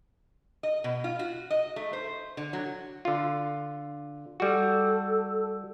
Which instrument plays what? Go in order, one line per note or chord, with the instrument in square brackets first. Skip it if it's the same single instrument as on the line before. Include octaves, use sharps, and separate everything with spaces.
[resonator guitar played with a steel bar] D#5
B2
F4
F#4
D#5
A3
C5
D3
F#3
[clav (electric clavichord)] D3 F4
[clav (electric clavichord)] G3 F#4 [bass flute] A4